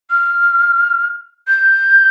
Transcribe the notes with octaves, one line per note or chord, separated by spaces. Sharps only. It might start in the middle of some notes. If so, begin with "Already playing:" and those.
F6
G6